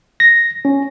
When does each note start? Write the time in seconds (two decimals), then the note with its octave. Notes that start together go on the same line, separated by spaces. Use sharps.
0.20 A#6
0.65 C#4